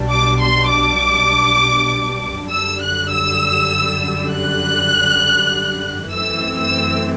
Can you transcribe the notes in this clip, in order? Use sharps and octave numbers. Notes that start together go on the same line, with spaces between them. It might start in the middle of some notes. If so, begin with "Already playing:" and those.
Already playing: B1 B2 G3 D4
D6
C6
D6
F#2 D3 G3 E6
F#6
E6
F#6
F#2 E3 A3 C4 E6
E6